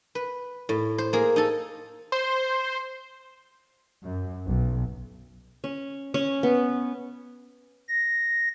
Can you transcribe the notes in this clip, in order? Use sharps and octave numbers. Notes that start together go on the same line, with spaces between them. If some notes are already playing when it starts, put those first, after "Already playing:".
B4
A2
C5
A#3 G#4
D#4 A4
C5
F#2
B1
C#4
C#4
B3
A#6